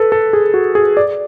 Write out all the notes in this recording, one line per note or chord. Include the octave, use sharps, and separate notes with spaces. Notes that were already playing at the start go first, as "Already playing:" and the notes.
Already playing: A4 B4
A4
G#4
F#4
G#4
D5